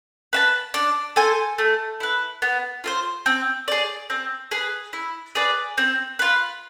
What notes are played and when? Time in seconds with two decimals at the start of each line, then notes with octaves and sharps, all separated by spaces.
0.33 B4 E5 A5
0.74 D4
1.16 A4 C5 G#5
1.58 A3
2.00 E4 B4
2.42 B3
2.84 F4 A4 C5
3.26 C4
3.68 G#4 D5
4.10 C4
4.51 G#4 B4
4.93 E4
5.35 G#4 B4 D5
5.78 C4
6.19 F4 B4